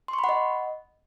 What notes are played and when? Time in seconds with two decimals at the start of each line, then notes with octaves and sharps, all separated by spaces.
0.08 C6
0.13 C#6
0.19 B5
0.24 F#5
0.29 D#5